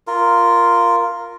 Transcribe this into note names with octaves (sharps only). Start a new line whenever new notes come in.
F4 A#4